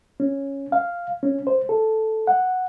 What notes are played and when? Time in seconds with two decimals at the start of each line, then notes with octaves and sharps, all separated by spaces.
0.20 C#4
0.72 F5
1.23 C#4
1.47 C5
1.69 A4
2.27 F#5